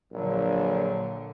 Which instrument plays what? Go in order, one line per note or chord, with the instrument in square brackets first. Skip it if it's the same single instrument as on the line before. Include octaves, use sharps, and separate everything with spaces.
[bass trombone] A#1 [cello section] A#2 D3 [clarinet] F#3